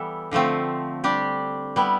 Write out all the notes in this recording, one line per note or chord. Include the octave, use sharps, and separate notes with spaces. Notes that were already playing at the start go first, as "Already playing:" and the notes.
Already playing: E3 G3 B3 E4 A4
D3 F3 A3 C4
G3 D4 G4
G3 B3 E4